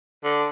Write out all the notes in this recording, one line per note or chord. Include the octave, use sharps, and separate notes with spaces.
D3